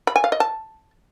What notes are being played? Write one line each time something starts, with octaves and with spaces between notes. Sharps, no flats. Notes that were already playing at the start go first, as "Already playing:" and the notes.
B5
G#5
F5
D#5
A5